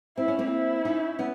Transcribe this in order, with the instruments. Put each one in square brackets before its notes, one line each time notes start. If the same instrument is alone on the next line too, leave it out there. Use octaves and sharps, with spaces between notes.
[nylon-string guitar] C4 [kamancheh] E4
[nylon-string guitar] C#4
A#3 C4
[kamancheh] E4
[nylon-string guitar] C#4 D#4
B3 C#4